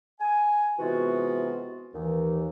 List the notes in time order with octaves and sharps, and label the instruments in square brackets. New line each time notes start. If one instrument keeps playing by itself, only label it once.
[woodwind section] G#5
C3 E3 G#3 B3 F4 F#4
D#2 E3